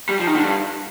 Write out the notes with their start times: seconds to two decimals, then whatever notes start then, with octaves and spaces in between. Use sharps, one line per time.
0.09 G3
0.19 F3
0.27 D#3
0.36 D3
0.43 G2